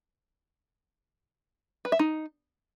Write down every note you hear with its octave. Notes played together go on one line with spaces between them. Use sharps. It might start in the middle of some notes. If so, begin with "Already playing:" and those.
B4
E5
D#4